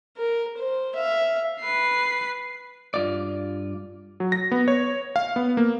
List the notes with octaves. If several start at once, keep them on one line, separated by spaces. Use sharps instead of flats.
A#4
C5
E5 F5
B4 C7
G2 F4 D5
F#3
A#6
B3
C#5
F5
B3
A#3